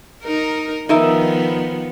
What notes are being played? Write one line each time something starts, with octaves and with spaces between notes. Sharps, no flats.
D#4 A#4
D#3 F3 B3 D#4 A#4 E5